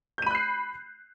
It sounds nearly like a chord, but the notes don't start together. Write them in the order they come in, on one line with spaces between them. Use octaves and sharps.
G6 D#7 B5 F#6 C7